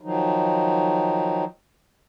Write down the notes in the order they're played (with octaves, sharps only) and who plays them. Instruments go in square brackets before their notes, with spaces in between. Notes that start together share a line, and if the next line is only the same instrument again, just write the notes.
[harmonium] D#3 F3 F#3 D#4